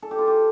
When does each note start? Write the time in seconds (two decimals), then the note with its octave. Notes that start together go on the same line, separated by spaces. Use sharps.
0.02 A4
0.11 G4
0.19 F4
0.28 G4